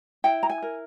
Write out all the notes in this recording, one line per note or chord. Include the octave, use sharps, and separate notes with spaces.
E4 G5
A#5
G#5
A#4